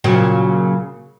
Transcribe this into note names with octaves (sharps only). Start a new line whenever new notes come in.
A#2 C#3 F#3